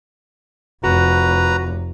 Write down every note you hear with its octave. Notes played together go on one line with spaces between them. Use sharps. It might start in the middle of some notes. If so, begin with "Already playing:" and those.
F1 F#4 B4 A#5